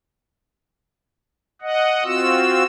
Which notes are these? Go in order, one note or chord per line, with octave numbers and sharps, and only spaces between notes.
D#5 F#5
C4 F4 F#4 E6